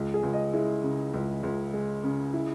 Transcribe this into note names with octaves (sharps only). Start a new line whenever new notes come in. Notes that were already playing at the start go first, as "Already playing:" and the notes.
Already playing: C#2
G#4
C#2
D#5
G#3 E4
C#3
C#2
C#2
G#3
C#3
E4